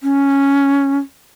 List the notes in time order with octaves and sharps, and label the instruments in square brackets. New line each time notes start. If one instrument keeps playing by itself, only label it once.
[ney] C#4